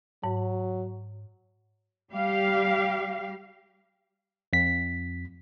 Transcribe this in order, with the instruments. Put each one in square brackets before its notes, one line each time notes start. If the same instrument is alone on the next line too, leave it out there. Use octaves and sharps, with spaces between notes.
[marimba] G#2 [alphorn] F#3
[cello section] G3 G4 F5
[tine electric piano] F2 B6